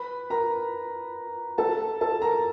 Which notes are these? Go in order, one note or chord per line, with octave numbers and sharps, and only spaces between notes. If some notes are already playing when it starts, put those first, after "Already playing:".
Already playing: B4 B5
A#4 A#5
A4 A5
A4 A5
A#4 A#5